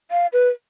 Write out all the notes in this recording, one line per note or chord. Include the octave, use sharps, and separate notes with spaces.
F5
B4